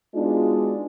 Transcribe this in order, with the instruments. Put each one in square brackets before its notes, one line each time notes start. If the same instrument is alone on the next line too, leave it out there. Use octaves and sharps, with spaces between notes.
[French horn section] G#3 B3 D4 D#4 F4 F#4